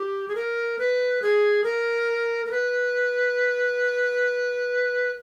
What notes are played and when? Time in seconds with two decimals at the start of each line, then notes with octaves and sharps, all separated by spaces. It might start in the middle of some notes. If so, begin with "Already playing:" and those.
Already playing: G4
0.28 G#4
0.35 A#4
0.79 B4
1.22 G#4
1.64 A#4
2.46 A#4
2.51 B4